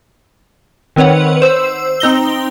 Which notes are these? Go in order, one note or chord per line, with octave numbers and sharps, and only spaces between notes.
D#3 C4 B4 C#5 F#5
C5 E6
C4 D#4 A#6 G7